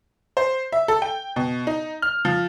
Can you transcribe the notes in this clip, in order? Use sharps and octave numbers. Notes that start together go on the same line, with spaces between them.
C5
E5
A4
G5
B2
D#4
F6
F3